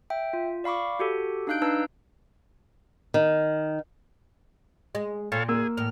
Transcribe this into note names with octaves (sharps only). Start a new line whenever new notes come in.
E5 G5
F4
D5 F5 B5 C#6 D6
F#4 G4 A4
D4 D#4 F5 F#6 G6 D7
D4 D#4 B4 A5 A#5 E6
D#3
G#3
A#2 A4 C#5 F5
A#3 G#4 E6
E2 A2 F6